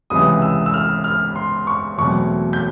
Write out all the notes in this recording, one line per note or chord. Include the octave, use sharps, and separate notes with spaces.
C#2 C3 E3 D#6
E6
E6
F6
F6
C6
C#6
E2 B2 F#3 A3 C4 C#6
G6